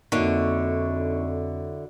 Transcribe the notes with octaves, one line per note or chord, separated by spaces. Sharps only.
F2 D3 F#3 A#3 D#4 E4 C#6